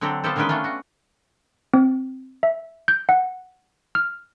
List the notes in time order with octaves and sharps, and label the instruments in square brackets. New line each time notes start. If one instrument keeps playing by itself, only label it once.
[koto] D3 F#3 C4 D4 G4 A4
B3 F4 G4 A4 C5
D3 D#3 G#3 C#4 B4 G5
A3 C#4 D4 F4
F#4
[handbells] C4
E5
G6
F#5
F6